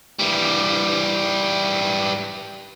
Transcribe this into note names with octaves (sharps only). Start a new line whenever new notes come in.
E3 G3